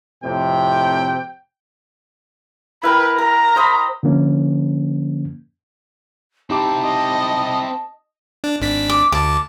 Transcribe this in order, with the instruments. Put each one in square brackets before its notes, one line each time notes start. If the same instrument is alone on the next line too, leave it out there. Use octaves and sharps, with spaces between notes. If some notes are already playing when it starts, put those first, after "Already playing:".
[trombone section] F2 A2 C3 [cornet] G5
[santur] E4 A#4 G5 [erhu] B4
[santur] A#4 [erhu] A#5
[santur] C5 D#5 B5
[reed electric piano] D3 F3 A#3 C#4
[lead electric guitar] C4 E4 [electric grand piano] D#4 G4 D6 [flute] A5
[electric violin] D#5
[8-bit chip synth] D4
G#1 D4 B6
[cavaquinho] D6
[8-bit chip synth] D2 A5 [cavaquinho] D6